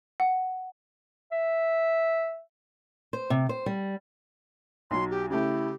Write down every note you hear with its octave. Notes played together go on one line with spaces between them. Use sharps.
F#5
E5
C5
C3
C5
G3
B1 F#3 C6
G4
C#3 A3 E4 G4